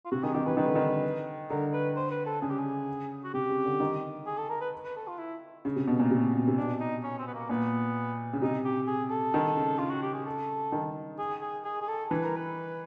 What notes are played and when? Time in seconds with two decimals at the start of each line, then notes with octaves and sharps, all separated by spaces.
0.05 F4
0.11 C3 F#4
0.23 D#3 G#4
0.34 D#3 G4
0.46 E3 B4
0.57 D#3 B4
0.66 D3
0.75 D#3
1.50 D3 A#4
1.73 B4
1.96 C5
2.11 B4
2.26 A4
2.42 C#3 G#4
2.50 G4
2.59 G#4
3.24 F#4
3.34 C3 G4
3.49 C#3
3.65 D3
3.80 D#3
4.26 G#4
4.38 A4
4.50 A#4
4.61 B4
4.84 B4
4.96 A4
5.07 F4
5.18 E4
5.65 C#3
5.76 C3
5.87 B2
5.99 A#2
6.11 C3
6.34 B2
6.48 C3
6.57 B2 D4
6.80 D#4
7.03 C#4
7.19 C4
7.27 B3
7.34 A#3
7.49 A#2 B3
8.33 C#3
8.42 C3 D#4
8.64 G4
8.87 G#4
9.10 A4
9.34 D#3
9.57 C#3
9.78 C#3 F4
9.90 F#4
10.02 G4
10.14 G#4
10.26 A4
10.72 D#3
11.19 G#4
11.41 G#4
11.64 G#4
11.82 G#4
11.88 A4
12.10 E3 B4
12.24 A#4
12.36 B4